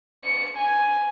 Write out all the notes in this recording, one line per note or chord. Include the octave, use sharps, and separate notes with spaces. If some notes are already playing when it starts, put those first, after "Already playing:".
C#7
G#5